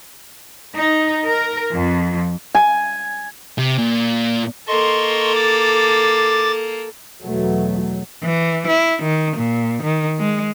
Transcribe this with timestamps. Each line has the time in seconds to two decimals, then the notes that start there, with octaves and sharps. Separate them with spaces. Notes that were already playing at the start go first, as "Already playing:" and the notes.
0.76 D#4
1.26 A#4
1.72 F2
2.55 G#5
3.58 C3
3.78 A#2
4.68 A#3 A4 D#5 C6 C#6
5.36 D6 A6
7.22 E2 B2 F#3 A3
8.23 E3
8.67 E4
9.03 D#3
9.37 A#2
9.83 D#3
10.19 G#3